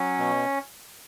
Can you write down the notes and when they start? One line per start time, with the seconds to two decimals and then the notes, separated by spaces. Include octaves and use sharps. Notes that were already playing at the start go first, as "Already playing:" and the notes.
Already playing: F#3 C#4
0.19 B2